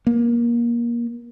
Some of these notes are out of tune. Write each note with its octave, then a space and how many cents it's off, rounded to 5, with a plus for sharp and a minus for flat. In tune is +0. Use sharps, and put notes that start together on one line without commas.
A#3 +25